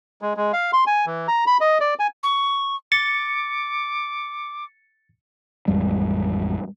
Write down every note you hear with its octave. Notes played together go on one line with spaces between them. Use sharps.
G#3
G#3
F5
C6
G#5
E3
A#5
B5
D#5
D5
G#5
C#6
D6 A6 C#7
A1 F2 G3 G#3